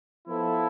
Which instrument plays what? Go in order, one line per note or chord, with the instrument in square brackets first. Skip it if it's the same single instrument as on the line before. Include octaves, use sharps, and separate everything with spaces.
[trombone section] F3 B3 F4 A4 [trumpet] E4